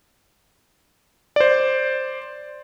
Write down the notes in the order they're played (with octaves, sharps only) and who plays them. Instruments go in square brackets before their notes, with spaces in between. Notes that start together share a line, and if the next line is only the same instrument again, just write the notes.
[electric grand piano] C5 D5